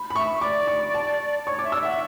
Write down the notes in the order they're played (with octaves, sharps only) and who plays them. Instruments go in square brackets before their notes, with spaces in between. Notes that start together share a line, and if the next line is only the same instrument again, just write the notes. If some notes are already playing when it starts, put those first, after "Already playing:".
Already playing: [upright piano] B5
B5
[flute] E5 [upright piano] C#6
[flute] D5 [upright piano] D6
[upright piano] C#6
A5
[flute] C#5 [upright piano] C#6
[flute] E5 [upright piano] D6
[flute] D5 [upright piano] E6
[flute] E5 [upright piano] F#5